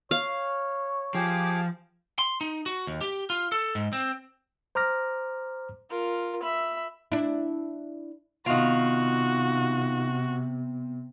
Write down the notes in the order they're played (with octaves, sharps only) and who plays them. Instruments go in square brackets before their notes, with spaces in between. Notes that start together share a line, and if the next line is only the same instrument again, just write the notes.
[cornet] C#5 [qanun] F5
[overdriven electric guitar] F3 [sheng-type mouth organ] G4 G#4 D6
[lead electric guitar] C6
D#4
F#4
D#2
G4
F4
A4
G#2
C4
[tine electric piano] C5 A#5 D6 F6 A#6
[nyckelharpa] F4 A#4
E5 B5
[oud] D4 E4
[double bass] C3 [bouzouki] D#3 F4 [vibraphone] B3 [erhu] F#4